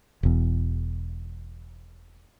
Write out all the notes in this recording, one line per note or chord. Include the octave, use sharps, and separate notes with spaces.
E1 E2